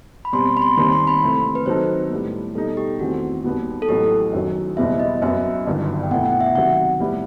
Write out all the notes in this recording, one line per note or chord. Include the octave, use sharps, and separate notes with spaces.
B5
B2 G3 C4 C6
B5
C6
D#2 D#3 G3 C4 C6
C6
B5
C3 E3 A3 C4
B4
D#3 F#3 C4 D#4 A4 C5
A2 G3 B3
B2 G3 D#4 A4
G4
E2 D#3 A3 C4 F#4
D#2 D#3 G3 B3 F#4
A4
A1 A2 F#3 B3 F#4 G4
F#2 D#3 F#3
F#1 E2 B2 G3 B3 E5
D#5
F#2 F#3 B3 E5
G1 G2 D#3 F#3
G5
B2 A3 E4 F#5
F#5
E5
C3 D#3 F#3 F#5
A2 G3 B3 E4